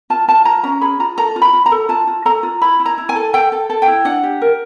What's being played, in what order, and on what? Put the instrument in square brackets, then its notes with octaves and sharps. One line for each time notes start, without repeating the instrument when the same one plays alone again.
[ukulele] F4 A5
F4 A5
F4 A#5
C#4 A#5
G#4 B5
F4 A#5
A4 A#5
F4
B5
F4
A#5
A4
F4 A5
F4
A4 A#5
F4
E4 B5
E4
A#5
E4
G#5
A4
A4 G5
A4
A4
G5
E4
D4 F#5
G4
A#4